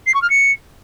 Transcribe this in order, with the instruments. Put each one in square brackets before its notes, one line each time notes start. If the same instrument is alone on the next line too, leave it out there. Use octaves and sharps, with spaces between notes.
[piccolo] C7
C#6
F6
C#7